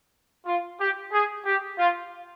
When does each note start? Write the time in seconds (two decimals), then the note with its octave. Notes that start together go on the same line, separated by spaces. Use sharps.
0.46 F4
0.80 G4
1.13 G#4
1.46 G4
1.79 F4